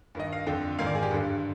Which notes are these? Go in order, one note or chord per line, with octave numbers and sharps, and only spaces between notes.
G2 D#3 D#5
F5
F2 D3 G5
G#2 D#3 F5
D5
G#4
G4
G2 D3